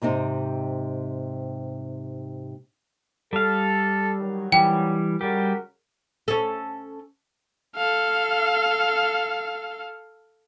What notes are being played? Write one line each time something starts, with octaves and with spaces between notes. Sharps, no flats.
G#2 C3 C4 D#4
G3 A4 F5
D#3 F#3
E3 G3 G5
C#3 G3 F#4 G4 A#4
C#4 A4
A4 F5